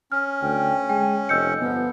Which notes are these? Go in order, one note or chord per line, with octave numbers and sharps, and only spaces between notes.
C#4 F6
D2 G5
G#3 G5 G#5
F1 D#5 E6 G6 C#7
G1 F3 B3